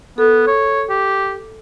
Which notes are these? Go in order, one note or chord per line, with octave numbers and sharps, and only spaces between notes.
B3 A4
C#5
G4